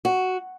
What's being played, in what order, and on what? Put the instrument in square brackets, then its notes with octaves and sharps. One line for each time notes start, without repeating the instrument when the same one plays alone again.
[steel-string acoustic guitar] F#4